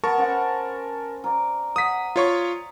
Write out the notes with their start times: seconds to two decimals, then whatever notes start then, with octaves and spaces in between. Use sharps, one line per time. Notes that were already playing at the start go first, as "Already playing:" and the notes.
0.04 B3 A#4 A5 C#6
0.18 C#4 C5 F#5
1.24 A#4 D5
1.76 F#5 D#6 B6
2.16 F4 C#5 C#6